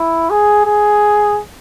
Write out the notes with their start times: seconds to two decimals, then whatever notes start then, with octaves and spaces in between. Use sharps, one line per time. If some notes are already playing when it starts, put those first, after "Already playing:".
Already playing: E4
0.30 G#4
0.66 G#4